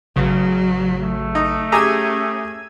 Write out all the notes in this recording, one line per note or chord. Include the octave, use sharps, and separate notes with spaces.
A1 C#3 F#3
A3
D#4
C#4 G4 G#4 A#5 E6 G#6 D#7